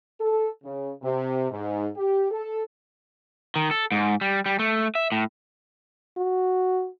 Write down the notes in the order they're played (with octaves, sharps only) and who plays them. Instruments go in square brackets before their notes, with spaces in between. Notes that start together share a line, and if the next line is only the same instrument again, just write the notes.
[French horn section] A4
C#3
C3
G#2
G4
A4
[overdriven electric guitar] D#3
A4
G#2
G3
G3
A3
E5
A2
[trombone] F#4